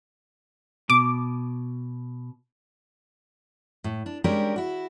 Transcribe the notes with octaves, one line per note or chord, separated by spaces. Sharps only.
B2 D6
A2
D4
G3 G#3 C#4 D4 G4 A#4
E4 F#4